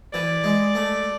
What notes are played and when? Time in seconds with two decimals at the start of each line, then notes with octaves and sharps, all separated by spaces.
0.13 E3 D5
0.44 G#3
0.75 A3